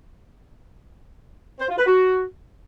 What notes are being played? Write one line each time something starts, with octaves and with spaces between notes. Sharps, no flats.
C5
F4
B4
F#4